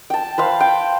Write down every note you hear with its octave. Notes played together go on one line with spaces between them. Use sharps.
G5 A5
B4 C5 F5
G5